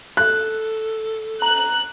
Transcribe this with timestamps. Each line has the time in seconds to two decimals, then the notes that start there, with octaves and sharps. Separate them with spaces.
0.17 A4 F#6
1.42 A#5 F#6